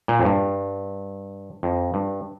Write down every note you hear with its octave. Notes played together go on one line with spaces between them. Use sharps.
A#2
F2
G2
F2
G2